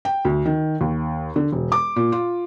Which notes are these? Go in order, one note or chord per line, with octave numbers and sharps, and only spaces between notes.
G5
D2
D#3
D#2
D3
E1
D6
A#2
F4